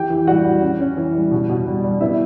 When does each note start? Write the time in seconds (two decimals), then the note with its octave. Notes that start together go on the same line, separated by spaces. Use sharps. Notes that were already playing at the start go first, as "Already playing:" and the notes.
Already playing: E3 G4 G5
0.10 E3
0.27 G3 F#4 F#5
0.45 G3
0.62 C#4
0.80 C#4
0.97 E3
1.15 G3
1.31 B2
1.49 B2
1.67 G3
1.84 G3
2.01 B3 E4 E5